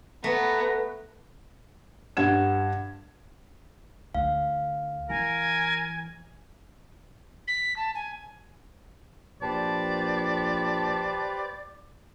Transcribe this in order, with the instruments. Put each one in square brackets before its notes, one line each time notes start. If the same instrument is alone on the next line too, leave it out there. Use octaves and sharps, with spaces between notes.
[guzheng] A3 [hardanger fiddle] B3 [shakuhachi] B4 [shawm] A#5
[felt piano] G2 F#5 G#6 E7
[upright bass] D2 [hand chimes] F5
[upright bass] E3 [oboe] A#4 [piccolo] G#5
[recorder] B6
A5
G#5
[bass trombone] A#1 [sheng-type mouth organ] G4 B4 C5 [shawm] D5 [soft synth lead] A5